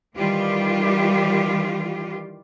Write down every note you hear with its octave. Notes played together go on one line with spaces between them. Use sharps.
D#3 E3 G3 F4 G4